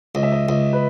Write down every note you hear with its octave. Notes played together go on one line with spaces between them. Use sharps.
C#2 D#5
E5
D#5
C#2 D#5
B4